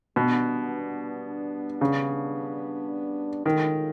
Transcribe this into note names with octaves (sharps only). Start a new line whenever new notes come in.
B2 G3 B3 D4
C#3
D#3 G#3 C#4 F4 A4